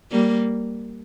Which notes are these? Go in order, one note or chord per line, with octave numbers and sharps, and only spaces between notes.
G3 A#3